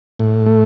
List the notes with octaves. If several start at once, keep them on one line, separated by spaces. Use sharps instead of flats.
A2
A3